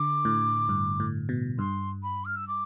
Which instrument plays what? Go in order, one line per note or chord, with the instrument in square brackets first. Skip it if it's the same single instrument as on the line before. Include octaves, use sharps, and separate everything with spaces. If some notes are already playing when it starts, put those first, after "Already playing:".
Already playing: [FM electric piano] D3 [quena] D6
[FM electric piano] A2
G2
A2
B2
[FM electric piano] G2 [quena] C6
[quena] B5
F6
E6
D6